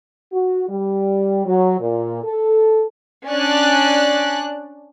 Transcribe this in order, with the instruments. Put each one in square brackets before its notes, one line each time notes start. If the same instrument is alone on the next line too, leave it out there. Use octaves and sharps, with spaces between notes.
[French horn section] F#4
G3
F#3
A#2
A4
[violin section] C#4 D4 D5 F#6